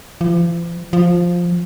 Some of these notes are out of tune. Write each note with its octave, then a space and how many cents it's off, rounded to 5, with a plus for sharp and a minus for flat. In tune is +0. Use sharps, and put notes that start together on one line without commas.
F3 -40
F3 +5